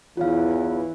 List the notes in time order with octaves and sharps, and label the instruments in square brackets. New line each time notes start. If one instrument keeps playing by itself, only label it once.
[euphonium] E2 [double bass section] E3 [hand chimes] F4 C#5 F5